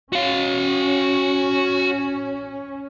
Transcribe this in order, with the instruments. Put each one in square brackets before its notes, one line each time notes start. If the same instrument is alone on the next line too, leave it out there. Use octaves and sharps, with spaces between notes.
[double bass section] C#4 [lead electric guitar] F#4 F5